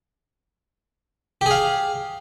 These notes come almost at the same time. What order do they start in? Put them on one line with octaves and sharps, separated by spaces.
G4 G#4 F5